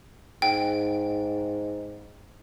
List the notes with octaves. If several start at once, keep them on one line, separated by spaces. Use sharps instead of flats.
G#2 G5